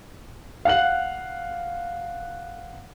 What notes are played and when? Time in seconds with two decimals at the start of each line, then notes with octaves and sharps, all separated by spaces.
0.65 F5 F#5 F#6 F#7